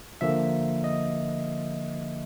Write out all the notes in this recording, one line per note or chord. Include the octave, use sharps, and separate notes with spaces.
D3 F3 A#3 E5
D#5